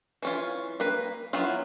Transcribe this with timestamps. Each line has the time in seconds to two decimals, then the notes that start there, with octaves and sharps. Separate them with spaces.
0.22 E3 C#4 F4
0.80 A#3 B4
1.33 F#3 B3 E4 F4